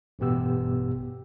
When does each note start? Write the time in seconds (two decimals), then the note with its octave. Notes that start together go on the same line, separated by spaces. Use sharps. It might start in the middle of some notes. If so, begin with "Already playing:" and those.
0.19 A1 G2 B2 B3 G4 E6